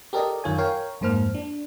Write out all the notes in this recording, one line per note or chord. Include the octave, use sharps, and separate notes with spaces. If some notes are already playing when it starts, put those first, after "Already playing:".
G4 A4 A#4 D5 D#5
F#2 D#3 F4 C#5 G#5
A#4 C#5 F5 G5
F2 G#2 A#3 C5 F6
D4